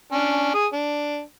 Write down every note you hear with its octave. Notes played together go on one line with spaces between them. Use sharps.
C#4 D4
G#4 D#6
D4